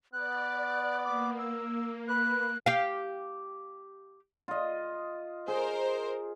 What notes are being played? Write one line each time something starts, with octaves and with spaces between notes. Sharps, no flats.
B3 D5 F#6
A#3 D6
E6
B4 F#6
G4 F5
F4 D#5
G#4 A#4 C5